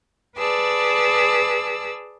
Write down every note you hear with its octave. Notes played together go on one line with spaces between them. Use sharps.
G#4 B4 D5 A5 E6